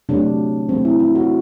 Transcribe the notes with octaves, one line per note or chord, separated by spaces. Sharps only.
C3 F#3 A3 D4
C3 F#3 A3 C4
E4
E4
F#4